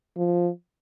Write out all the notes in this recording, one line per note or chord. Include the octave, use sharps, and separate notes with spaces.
F3